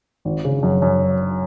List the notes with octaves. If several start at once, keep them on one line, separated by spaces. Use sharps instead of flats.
G#1
C#3
F#2
F#2